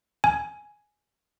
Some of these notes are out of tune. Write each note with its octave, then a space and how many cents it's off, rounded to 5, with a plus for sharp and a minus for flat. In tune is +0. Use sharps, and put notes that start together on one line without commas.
G#5 +5